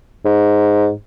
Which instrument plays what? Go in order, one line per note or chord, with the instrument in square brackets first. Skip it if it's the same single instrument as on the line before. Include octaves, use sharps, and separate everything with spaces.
[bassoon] G#2